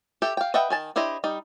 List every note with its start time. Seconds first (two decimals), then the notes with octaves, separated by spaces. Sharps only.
0.22 G4 A4 E5 G5
0.37 F5 G5
0.54 B4 D#5 E5 F#5 G5
0.70 D#3 G#5 A5
0.96 D4 E4 G4 C5 D#5
1.24 G3 D#4